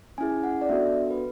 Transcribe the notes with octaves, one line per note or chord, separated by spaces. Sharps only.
C#4 E4 G#4 G#5
F#5
D5
B3 D4 F#4 A4 E5
B4